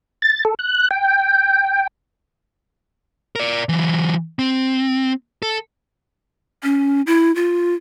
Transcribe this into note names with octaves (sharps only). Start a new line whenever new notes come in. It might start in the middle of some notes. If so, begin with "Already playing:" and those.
A6
A4
F#6
G5
A#4 D5
E3 F#3
C4
A4
C#4
E4
F4